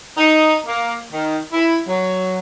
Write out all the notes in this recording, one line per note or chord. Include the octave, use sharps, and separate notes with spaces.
D#4
A#3
D#3
E4
F#3